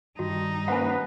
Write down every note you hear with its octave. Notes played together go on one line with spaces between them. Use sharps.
G2 D#3 G3 D#4 F#4
A#3 C#4 B4 C5 F#5 G#5